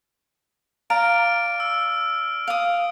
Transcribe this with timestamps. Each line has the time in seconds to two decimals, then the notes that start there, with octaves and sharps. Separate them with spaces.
0.90 D5 F5 A#5 F6 D7
1.60 E6
2.48 F5 D#6